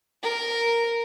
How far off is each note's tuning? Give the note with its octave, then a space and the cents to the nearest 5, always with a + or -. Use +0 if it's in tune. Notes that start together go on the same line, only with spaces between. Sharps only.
A#4 -5